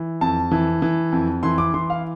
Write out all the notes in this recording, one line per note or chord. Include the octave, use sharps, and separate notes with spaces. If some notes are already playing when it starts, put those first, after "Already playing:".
Already playing: E3
F2 A5
E3
E3
F2
E3 C6
D6
E3 C6
F5